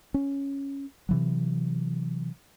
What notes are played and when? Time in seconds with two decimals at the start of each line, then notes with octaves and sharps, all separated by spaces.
0.14 C#4
1.09 C3 E3 F#3